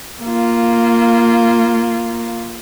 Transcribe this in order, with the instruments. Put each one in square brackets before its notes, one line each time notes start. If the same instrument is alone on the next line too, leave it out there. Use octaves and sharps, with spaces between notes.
[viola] A#3 F4